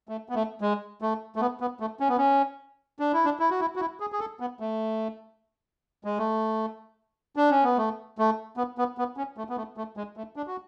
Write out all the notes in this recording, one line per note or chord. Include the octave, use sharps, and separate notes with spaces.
A3
B3
A3
G#3
A3
A3
B3
B3
A3
C#4
B3
C#4
D4
E4
D4
E4
F#4
E4
F#4
E4
G#4
G#4
A4
B3
A3
G#3
A3
D4
C#4
B3
A3
A3
B3
B3
B3
C#4
A3
B3
A3
A3
G#3
A3
D4
F#4